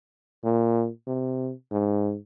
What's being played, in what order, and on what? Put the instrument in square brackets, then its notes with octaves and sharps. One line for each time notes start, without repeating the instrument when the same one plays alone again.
[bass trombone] A#2
C3
G#2